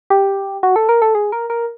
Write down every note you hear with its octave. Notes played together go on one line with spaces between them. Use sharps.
G4
F#4
A4
A#4
A4
G#4
A#4
A#4